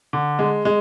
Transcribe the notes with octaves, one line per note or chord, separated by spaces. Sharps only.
D3
G#3
G#3